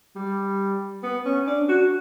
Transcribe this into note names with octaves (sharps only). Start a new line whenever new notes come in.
G3
B3
C#4
D4
F#4